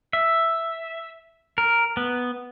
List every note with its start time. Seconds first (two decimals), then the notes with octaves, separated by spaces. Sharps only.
0.13 E5
1.58 A#4
1.97 B3